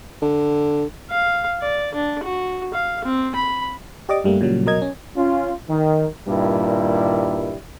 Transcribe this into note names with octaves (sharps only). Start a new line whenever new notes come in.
D3
F5
D5
D4
F#4
F5
C4
B5
G4 D5 D#5 D6
G2 G3 A3 A#3
A#2 C#3 F#3 G3
B2 F#3 A#4 D#5 G#6
C#4
C#4 F4
D#3
G2 A#2 D#3 G3 E4